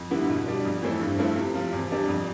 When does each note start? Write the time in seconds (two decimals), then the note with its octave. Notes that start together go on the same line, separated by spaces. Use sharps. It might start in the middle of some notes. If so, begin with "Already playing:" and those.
Already playing: F2
0.11 D3 G3 B3 E4
0.30 B2
0.46 G3 D4
0.65 F2
0.82 E3 A3 C4 E4
1.01 G2
1.18 F3 A3 C4 E4
1.36 C3
1.54 F3 C4
1.73 E2
1.89 C3 G3 D4
2.08 F2